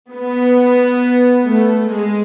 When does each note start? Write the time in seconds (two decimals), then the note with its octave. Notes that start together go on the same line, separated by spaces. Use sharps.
0.12 B3
1.45 A3
1.89 G#3